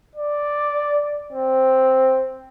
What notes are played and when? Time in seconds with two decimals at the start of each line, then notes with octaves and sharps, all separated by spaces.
0.15 D5
1.32 C4